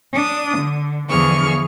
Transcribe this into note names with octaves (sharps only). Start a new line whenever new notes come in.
D4 D#6
D3
E2 D3 F3 G#4 C#6 F6